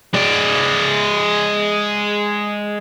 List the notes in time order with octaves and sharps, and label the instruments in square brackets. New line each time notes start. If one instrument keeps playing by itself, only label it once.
[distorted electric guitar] G#3 D5